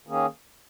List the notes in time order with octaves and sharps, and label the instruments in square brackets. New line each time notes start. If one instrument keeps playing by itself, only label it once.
[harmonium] D#3 A#3 C#4 G#4